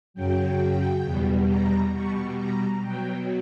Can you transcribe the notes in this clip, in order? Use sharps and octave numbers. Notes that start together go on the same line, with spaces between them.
F#2 C#3 F#3 G5
E2 B2 G3
A#5
B2 G3 C#6
A#5
B2 F#3 G5